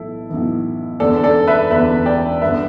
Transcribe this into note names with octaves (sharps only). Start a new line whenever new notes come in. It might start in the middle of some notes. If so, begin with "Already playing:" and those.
Already playing: B1 A2 E3 E4 A4
B1 A2 E3
E1 E2 D3 A4 D5
A4 D5
B4 E5
E1 E2 D3 B4 E5
D5 G5
G1 G2 D3 B4 E5